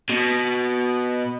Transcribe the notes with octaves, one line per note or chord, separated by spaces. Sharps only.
B2